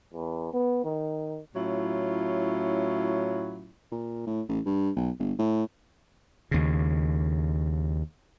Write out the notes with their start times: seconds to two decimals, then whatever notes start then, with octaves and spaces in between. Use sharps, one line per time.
0.13 E2
0.53 B3
0.84 D#3
1.55 A2 F#3 C#4 E4 F4
3.92 A#2
4.27 A2
4.49 A1
4.66 G2
4.96 B1
5.19 G1
5.39 A2
6.51 D#2 C#3